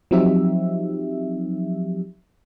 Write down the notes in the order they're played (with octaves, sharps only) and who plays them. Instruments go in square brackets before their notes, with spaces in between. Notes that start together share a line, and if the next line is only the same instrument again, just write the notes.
[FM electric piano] F3 F#3 C4 D#4 G4 E5